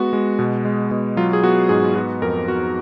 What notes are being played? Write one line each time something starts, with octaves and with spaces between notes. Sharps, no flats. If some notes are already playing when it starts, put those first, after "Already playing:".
Already playing: G#3 B3 F#4
G#3
B2
G#3
B2
F#3 F4
G#4
B3 F#4
G#2 G#4
B3 F#4
F2 A#4
B3 F#4